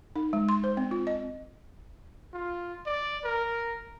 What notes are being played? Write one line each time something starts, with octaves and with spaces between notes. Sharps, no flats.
D#4
G#3
C6
C5
C4
F4
D#5
F4
D5
A#4